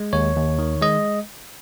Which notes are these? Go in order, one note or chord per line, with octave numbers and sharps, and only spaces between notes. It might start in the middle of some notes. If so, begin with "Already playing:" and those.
Already playing: G#3
D#2 C#5
D#2
D#3
G#3 D#5